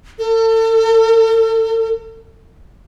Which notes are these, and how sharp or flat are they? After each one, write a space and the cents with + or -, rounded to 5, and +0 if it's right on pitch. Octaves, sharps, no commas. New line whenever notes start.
A4 +35